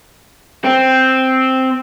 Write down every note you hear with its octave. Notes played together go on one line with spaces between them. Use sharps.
C4